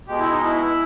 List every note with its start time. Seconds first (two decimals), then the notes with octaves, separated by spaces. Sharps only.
0.07 B2 G#3 G4
0.19 E4
0.30 D#4
0.43 E4